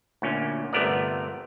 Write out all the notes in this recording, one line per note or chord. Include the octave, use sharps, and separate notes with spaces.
D2 A#2 C#4
G1 C3 A3 B3 A#4 D5